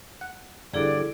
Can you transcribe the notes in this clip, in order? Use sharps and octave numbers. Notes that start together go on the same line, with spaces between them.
F#5
G1 G2 E4 G#4 A4 D5